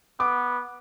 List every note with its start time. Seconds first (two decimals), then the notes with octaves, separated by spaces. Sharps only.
0.20 B3 D6